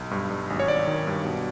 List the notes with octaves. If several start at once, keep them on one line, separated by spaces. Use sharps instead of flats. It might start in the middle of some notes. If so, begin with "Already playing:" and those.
Already playing: B1
G2
G2
G#1
C#5
G#1 D5
D#3
G2
B2